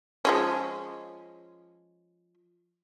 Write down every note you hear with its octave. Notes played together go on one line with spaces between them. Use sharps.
F3 G#3 C#4